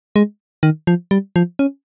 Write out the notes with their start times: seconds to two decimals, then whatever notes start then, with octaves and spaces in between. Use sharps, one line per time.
0.16 G#3
0.63 D#3
0.87 F3
1.11 G3
1.36 F3
1.59 C#4